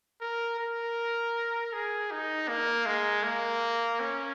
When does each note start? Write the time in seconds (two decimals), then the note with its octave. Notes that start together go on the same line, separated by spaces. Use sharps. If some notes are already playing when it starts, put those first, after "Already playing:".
0.21 A#4
0.59 A#4
1.73 G#4
2.11 D#4
2.48 A#3
2.86 G#3
3.24 A#3
4.00 C#4